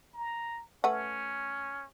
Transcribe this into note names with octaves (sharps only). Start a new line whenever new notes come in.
A#5
A3 C#4 B4 F#5